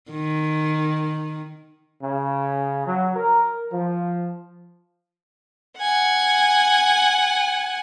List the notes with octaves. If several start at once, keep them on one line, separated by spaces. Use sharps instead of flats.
D#3
C#3
F#3
A#4
F3
F#5 G#5